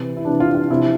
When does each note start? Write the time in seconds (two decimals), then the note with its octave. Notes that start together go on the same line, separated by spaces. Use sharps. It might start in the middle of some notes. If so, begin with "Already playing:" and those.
Already playing: C3 E3
0.17 E4
0.25 C3 E3 D4
0.40 F4
0.55 F4
0.70 C3 F3 E4